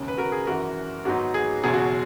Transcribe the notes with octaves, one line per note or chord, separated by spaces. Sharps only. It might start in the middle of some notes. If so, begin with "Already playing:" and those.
Already playing: E1 D#2 C#3
B4
F#4 A#4
G#4
G#1 F#2 E3 F#4 A#4
G#1 G#2 F#3 B3 D#4 F#4
G#4
F#1 E2 B2 F#3 G#4
F#4